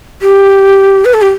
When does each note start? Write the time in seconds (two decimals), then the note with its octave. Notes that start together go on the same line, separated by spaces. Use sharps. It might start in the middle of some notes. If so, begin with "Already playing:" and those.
0.22 G4
1.05 B4
1.14 A4
1.22 G4